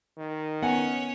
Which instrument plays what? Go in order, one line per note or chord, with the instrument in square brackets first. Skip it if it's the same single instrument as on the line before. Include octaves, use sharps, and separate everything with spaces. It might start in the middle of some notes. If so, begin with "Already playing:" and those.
[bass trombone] D#3
[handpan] B3 [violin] C#4 C#5 [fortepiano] F#5 G#5